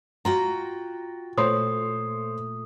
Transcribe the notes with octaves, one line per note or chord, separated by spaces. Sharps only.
F4 F#4 G5 A#5
A#2 A3 C5 C#5 C6 D#6